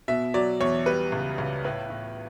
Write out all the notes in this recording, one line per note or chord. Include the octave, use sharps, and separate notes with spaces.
B2 E5
F#3 D5
E2 C#5
G3 B4
C#2
C#2
A2 B4
A2